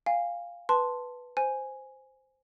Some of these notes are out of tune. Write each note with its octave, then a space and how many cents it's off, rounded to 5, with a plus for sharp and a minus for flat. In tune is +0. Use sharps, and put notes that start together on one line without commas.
F5 +0 G#5 -30
B4 +0 A5 +0 C6 +0
C5 +0 G#5 +0